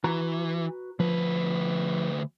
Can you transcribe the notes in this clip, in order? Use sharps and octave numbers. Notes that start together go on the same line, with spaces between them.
E3 F#4 B4 A#5
D2 F3 B4